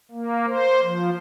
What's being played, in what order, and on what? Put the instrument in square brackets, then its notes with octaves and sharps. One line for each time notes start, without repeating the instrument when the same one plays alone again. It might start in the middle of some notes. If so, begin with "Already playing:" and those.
[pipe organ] A#3
C5
F3